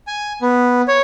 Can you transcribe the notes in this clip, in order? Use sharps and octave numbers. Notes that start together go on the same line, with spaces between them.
G#5
B3
C#5